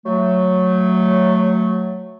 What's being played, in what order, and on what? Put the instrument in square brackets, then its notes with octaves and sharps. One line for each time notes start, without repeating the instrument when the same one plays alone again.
[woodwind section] F#3 A3